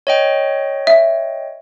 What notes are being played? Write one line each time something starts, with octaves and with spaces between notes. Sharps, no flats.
C#5 D#5 G5
E5